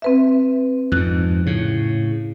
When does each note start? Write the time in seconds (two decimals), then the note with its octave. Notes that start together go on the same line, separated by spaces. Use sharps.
0.02 C4 B4 E5
0.92 F2 G#2 F#6
1.46 A2 C#3